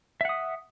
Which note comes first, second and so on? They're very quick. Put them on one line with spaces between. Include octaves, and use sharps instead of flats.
E5 F#5 D#6